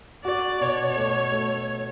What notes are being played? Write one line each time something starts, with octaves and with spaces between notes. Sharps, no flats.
F#4 D5
B2 C#5
A3
A3